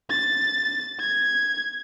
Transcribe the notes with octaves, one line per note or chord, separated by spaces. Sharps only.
A6
G#6